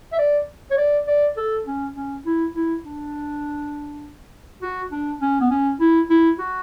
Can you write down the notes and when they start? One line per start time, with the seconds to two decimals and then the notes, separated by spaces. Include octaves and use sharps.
0.13 E5
0.19 D5
0.71 C#5
0.78 D5
1.07 D5
1.37 A4
1.66 C#4
1.96 C#4
2.26 E4
2.55 E4
2.85 D4
4.62 F#4
4.91 D4
5.21 C#4
5.40 B3
5.50 C#4
5.80 E4
6.10 E4
6.39 F#4